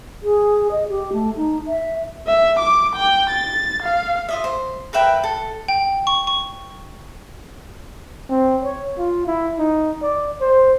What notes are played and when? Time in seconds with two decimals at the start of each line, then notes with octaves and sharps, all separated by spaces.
0.23 G#4
0.71 D#5
0.89 G4
1.13 A3
1.36 D#4
1.67 E5
2.27 E5
2.59 D6
2.95 G5
3.30 A6
3.82 F5
4.29 F4 D#5 E5
4.44 C5
4.93 A#4 B4 E5 G5
5.24 A4
5.68 G5
6.07 C#6
6.27 C#6
8.30 C4
8.63 C#5
8.98 F4
9.27 E4
9.59 D#4
10.02 D5
10.41 C5